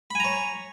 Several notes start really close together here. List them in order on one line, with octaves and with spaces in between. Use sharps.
B5 G#5 A#5 C#5